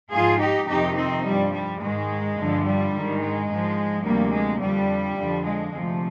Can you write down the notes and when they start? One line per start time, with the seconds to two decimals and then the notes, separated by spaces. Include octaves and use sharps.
0.11 G#2 F3 F4 G#4
0.39 D#4 G4
0.68 F2 C3 D#3 D#4 G4
0.96 C4 D#4
1.24 G2 F3 G3
1.52 G3
1.80 G#2 D#3 G#3
2.36 G2 D3 F3
2.64 G3
2.92 G#2 D#3
3.20 G#3
3.48 G#2 F3
4.04 D2 C3 F3 G3 A#3
4.32 G#3
4.60 F2 D3 F3 G3
5.16 F2 D3 F3
5.45 G#3
5.73 D2 C3 F3